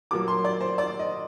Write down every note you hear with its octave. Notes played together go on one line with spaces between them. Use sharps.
A#2 F#3 A#3 D6
C6
D5
C5
D5
D#5